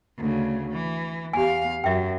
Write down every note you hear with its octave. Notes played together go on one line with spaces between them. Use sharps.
D2 C#3
E3
E2 G4 F5 G#5
F#2 E5 G5